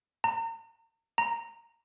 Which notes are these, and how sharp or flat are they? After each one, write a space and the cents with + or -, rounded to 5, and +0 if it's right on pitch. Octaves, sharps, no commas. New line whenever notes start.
A#5 -35
A#5 -5